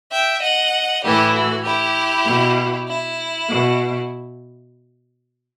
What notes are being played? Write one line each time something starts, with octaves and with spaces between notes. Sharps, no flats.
E5 G5
D#5 F#5
A2 E3 E4 G4
F#4
E4 G4
B2
E4
B2